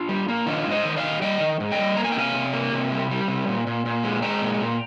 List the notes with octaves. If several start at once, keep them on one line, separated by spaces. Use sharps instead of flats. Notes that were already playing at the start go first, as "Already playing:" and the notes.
Already playing: D4 F4
G3
A#3
D#3 D4 F4
G#2
C5 D#5
D#3
D5 F5
D#3
G3 D#5 G5
D#3
G#2
D#5 G5
G3
A#3 A#5
G#5
G5
C3 F5 G#5
C3
A#3
C3
G3
G3
C3
A#2
A#2
A#2
G#3
G#3 G5 A#5
A#2
A#2